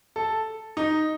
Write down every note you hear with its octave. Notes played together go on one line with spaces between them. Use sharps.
A4
D#4